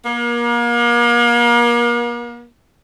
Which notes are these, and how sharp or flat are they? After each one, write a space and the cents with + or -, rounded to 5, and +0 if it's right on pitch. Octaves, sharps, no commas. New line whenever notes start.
A#3 +35